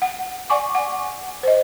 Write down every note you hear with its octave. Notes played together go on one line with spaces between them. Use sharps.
F#5
D5 F#5 G#5 C#6 D6
F#5
C5 D#5